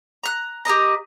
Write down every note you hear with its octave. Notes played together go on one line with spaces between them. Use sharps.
A#5 F#6
G4 A#4 D#5 A#5